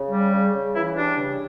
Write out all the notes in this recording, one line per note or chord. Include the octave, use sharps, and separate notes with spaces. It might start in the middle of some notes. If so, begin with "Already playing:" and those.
Already playing: C#3
G3
C#3
C#3
E3 E4
G3 D4
C#3